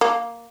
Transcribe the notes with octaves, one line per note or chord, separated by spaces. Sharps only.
A#3